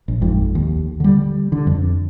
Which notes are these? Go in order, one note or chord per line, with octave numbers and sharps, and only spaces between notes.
A#1
G#1 F2 G#2
D#2
D3 G3
D3
F2